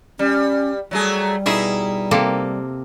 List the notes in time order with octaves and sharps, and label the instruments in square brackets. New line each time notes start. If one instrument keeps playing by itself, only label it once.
[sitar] G3 [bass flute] C#4
[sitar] F#3 A3 G#4 [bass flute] G3
[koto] B2 G#4 E5 [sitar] D#4 E4
[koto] C3 A#3 A4